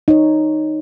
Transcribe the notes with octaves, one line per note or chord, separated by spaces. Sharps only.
D#4 C#5